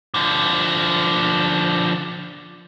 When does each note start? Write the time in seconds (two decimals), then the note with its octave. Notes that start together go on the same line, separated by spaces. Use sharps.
0.14 D3 F3